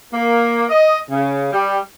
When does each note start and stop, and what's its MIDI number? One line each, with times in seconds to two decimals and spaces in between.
0.13 0.64 58
0.69 0.98 75
1.10 1.52 49
1.53 1.79 55